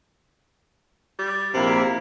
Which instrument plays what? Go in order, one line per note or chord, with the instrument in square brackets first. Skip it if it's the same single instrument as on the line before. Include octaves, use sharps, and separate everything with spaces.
[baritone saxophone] G3
[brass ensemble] A#1 A#3 E4 [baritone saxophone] C3